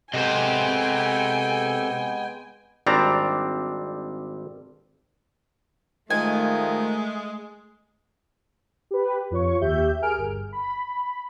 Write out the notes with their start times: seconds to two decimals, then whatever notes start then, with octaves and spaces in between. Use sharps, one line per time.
0.14 C3 G#3 B3 A4 C5 D#5 G5 G#5
2.86 G#1 G3 C4 D4 D5 A#5
6.10 D#3 F3 G#3 A3 G#5
8.91 G4 B4
9.31 F2 F4 C#5 C#6
9.61 D#2 G4 E5 G6
10.02 G#4 A#4 G#5 F6 D7
10.18 G1
10.52 B5